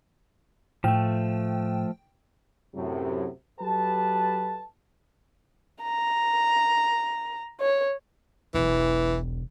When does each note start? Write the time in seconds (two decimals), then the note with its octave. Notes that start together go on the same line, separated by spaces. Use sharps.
0.84 A2 F3 A3 G5
2.75 F#2 A2 C3 F#3
3.60 F#3 G4 A4 B4 A5
5.82 A#5
7.61 C#5
8.54 E1 B1 E3